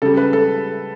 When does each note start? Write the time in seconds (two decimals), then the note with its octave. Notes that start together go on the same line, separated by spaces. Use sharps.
0.02 C#3 G3 A4
0.17 B4
0.33 A4